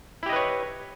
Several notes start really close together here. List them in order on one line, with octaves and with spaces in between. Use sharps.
E4 G4 D#5 B4 C#5